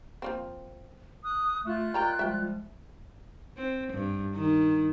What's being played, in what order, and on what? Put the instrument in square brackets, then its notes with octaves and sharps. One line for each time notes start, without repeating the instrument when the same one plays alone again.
[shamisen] F3 A#3 C4
[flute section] D#6 F#6
[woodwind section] A3 [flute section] F4 F#6
[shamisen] A#4 A#5 B5 [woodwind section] D5 D#5 G5
[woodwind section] F3 G3 G#3 [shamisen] E5 G5
[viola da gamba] C4
G2
D#3